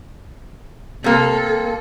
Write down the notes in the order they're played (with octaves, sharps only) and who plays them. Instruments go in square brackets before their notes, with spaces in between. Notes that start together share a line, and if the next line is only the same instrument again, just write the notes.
[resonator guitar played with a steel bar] C3 A#3 [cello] A4